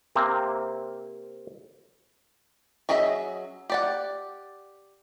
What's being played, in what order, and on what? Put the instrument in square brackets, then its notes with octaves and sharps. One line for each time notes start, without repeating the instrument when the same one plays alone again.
[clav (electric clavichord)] C3 A#3 C4
[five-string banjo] F#3 C#4 G#4 D#5 E5
G4 D5 F#5